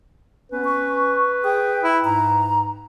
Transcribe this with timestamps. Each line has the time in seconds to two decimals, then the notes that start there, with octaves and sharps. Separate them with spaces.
0.52 B3 C#4 B4
0.64 C#6
1.44 G#4 G5
1.83 E4
2.04 G#2 A#5